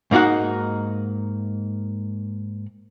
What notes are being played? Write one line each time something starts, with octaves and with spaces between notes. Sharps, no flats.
G#2 A#3 D#4 F#4 F#5